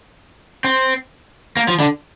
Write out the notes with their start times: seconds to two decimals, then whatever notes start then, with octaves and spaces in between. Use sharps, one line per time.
0.64 C4
1.57 A#3
1.68 F3
1.80 D3